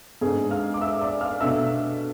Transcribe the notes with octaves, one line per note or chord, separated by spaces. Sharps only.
G#2 G#3 B3 D4 G#4 G#5
F5 F6
D6
E5 E6
D5 D6
F5 F6
B2 A3 D4 E5 E6